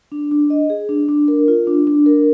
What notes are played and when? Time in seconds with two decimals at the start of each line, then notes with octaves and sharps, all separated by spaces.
0.12 D4
0.32 D4
0.50 D#5
0.70 G#4
0.89 D4
1.09 D4
1.28 A#4
1.48 F4
1.67 D4
1.87 D4
2.06 A#4